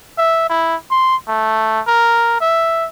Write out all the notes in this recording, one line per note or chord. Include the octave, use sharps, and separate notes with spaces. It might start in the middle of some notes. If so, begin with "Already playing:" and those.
E5
E4
C6
A3
A#4
E5